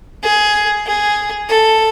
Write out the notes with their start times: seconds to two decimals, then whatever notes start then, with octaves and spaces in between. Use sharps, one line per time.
0.23 G#4
0.87 G#4
1.49 A4